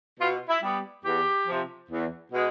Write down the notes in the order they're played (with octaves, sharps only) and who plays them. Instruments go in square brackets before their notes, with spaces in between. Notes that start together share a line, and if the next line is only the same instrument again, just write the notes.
[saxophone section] B2 F4
E4
G3 B3
E2 G4
C3 F3
E2
B2 G#3